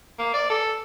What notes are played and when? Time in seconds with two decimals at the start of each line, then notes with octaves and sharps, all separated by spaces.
0.19 A#3
0.34 D5
0.50 A4